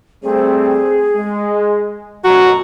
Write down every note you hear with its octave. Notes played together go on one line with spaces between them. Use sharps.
G3 A3 C4 G#4
G#3
A1 F#2 B2 F#4 A#5